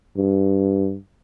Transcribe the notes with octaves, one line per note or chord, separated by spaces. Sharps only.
G2